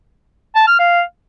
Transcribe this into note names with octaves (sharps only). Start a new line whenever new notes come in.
A5
F6
F5